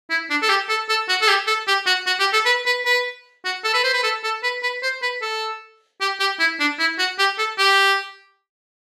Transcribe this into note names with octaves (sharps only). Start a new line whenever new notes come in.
E4
D4
A4
G4
A4
A4
F#4
A4
G4
A4
G4
F#4
F#4
G4
A4
B4
B4
B4
F#4
A4
B4
C5
B4
A4
A4
B4
B4
C5
B4
A4
G4
G4
E4
D4
E4
F#4
G4
A4
G4